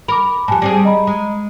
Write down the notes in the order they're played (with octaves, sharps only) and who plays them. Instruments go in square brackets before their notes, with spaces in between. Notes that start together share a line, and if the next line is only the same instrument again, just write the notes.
[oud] A#4 [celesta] B5 D6
[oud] F2 A#2 [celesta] G4 G#5 A5
[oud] G3 C4 G#4
[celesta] D#5 A#5 B5
[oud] G#3